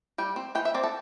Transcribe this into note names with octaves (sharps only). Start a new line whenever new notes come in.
G3 G5
C4
E3 G5
E5
C4 D5
A4